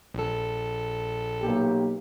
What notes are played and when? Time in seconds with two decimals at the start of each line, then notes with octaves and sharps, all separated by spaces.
0.14 A#1 A4
1.42 B1 A#3 G4